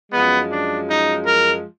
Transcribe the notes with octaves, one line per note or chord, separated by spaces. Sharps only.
F#2 F3 G#3 B3
D4
D#4
A#4